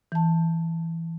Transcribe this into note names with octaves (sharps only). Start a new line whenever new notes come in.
E3 A5